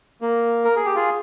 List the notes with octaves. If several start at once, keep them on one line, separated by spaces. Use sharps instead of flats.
A#3
A#4
G#4
G4
F4 G#4